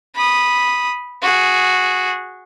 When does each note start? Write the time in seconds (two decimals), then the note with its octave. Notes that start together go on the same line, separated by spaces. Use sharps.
0.15 B5 D#6
1.22 F#4 G#4